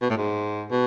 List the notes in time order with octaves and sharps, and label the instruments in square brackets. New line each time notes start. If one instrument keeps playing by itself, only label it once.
[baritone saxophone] B2
A2
G#2
B2